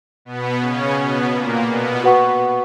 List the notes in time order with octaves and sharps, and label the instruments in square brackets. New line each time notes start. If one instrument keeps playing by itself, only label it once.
[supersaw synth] B2 B3
C#3 C#4
B2 B3
A#2 A#3
B2 B3
[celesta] F#4 B4 F#5 C#6